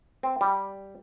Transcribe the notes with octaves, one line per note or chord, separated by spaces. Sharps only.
C4
G3